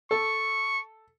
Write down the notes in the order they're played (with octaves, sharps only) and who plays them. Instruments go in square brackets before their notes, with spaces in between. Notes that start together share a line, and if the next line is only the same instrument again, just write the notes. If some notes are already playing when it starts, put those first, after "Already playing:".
[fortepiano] A4 [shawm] C#6